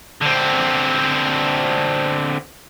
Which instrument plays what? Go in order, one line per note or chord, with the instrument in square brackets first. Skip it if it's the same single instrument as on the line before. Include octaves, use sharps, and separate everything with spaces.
[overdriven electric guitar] D3 C4